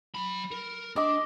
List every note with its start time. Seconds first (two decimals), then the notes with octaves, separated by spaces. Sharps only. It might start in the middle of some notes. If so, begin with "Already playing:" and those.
0.15 F#3 B5
0.52 A#4
0.96 D4 D#5 D6